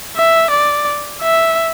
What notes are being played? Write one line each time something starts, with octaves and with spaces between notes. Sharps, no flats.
E5
D5
E5